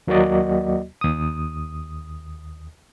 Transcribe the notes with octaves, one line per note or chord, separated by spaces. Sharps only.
D#2 F#3 A#3 F#4 D5 D#5
D#2 D#6